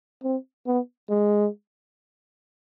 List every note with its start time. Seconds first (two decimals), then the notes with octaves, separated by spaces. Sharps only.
0.23 C4
0.66 B3
1.09 G#3